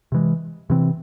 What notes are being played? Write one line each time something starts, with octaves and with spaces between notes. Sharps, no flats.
C3 E3 G#3
C3 E3 C4